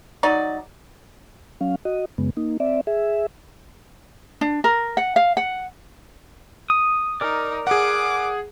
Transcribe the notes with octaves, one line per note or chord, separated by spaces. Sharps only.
F#3 D#4 D5
F#3 C#4 F5
F#4 D#5
F#2 C#3 G#3 B3
A#3 D#4
C4 D5 E5
G#4 E5
D4
A#4
F#5
F5
F#5
D#6
D#4 A#4 D5
G#4 F#5 D6